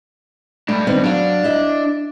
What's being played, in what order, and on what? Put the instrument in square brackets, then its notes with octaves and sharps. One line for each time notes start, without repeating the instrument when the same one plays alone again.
[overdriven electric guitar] G2 D4 [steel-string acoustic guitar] A3
[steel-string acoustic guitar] D#3 B3 C4
[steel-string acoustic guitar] F#3 F5 [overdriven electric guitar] D4
[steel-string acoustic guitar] E4 D#5 E5